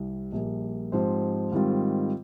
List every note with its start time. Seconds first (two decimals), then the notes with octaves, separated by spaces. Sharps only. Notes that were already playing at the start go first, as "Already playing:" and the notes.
Already playing: C2 C3 G3
0.32 A#1 A#2 G3 A#3
0.92 G#2 F3 C4 G4 C5
1.52 G#2 D#3 G3 C4 F4